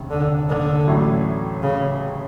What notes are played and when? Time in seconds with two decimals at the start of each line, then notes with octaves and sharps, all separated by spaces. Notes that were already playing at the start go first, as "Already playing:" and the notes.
Already playing: F1 D#2 C#3
0.11 D3
0.49 D3
0.87 A1 A2 F#3
1.62 C#3